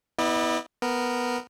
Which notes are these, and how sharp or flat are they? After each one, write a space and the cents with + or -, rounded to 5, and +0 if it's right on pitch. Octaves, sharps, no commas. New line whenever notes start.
B3 +0 E4 -25 D5 +35
B3 +0 A#4 +0